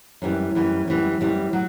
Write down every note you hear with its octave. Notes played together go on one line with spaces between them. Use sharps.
F#2 E3 G3
F#2 E3 G3
F#2 E3 G3
F#2 E3 G3
F#3